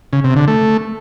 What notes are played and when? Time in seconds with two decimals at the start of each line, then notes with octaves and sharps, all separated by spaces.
0.13 C#3
0.24 C3
0.36 D3
0.48 A3